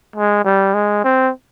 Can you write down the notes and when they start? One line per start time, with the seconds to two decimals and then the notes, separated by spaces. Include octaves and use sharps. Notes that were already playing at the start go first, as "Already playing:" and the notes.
0.16 G#3
0.44 G3
0.74 G#3
1.04 C4